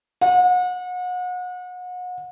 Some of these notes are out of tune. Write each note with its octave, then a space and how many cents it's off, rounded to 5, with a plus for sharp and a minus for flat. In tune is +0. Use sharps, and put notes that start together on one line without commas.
F#5 -35